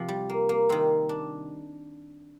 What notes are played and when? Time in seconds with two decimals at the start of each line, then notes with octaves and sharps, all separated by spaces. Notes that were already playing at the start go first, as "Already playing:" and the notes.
Already playing: C3 F3
0.08 G3
0.29 A#3
0.49 A#3
0.69 C3 D#3 C4
1.09 D4